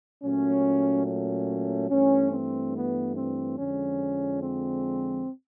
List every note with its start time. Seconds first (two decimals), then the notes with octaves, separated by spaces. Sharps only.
0.23 A#2 F#3 A3 C#4
1.06 C#4
1.90 G2 E3 A3 C#4
2.32 C4
2.75 B3
3.15 C4
3.57 F2 D3 F3 G#3 C#4
4.41 C4